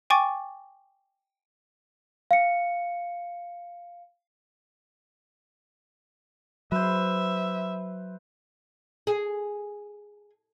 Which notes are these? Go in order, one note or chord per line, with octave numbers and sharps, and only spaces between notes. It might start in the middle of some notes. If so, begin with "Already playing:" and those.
G5 G#5 C#6 D6 A6
F5 C#7
F#3 B4 C5 E5
G#4